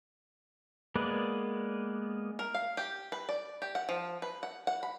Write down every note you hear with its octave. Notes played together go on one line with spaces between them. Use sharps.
G#3 A#3 B3 B4 D5
A#4
F5
G4
B4
D5
G4
F#5
F3
B4
F#5
F#5
B5